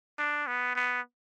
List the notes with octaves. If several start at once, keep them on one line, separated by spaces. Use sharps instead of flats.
D4
B3
B3